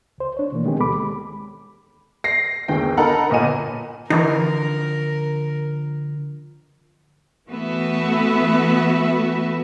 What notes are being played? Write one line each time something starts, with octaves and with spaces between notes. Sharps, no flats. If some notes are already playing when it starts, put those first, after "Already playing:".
C#2 C5
D4 C#5
B2 E3 A#3
D#3 G#3 B3 C4 G4 G#4
D2 G#3 A4 B5 D6
A#6 C7
G1 D#2 D3 G#4 G5
D#4 A4 A#4 F#5 A#5 B5
G1 A#2 D#5 G#5 D#7
D3 E3 F3 D#4 A#4
E3 A3 B3 F#4 B4 E5